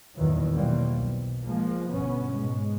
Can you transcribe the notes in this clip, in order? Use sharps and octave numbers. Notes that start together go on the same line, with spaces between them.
E2 G2 A#2 D#3 E3 F#3
B2 E3 F#3 G3 A#3 C4
B1
F3 G#3 A#3
G1 B2 B3 C#4
G#2 B2 G#3